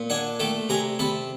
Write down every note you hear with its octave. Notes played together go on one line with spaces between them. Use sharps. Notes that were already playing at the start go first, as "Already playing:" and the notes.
Already playing: A#2
D4 F#5 G#5
A3 G5 A5
C3 G#5 A#5
C3 A5 B5